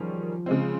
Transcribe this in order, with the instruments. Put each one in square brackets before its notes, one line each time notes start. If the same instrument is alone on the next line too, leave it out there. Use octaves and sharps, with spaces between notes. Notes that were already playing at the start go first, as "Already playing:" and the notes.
Already playing: [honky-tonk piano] D#3 G3 C#4 G#4 [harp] F3
[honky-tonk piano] C#3 G#3 C4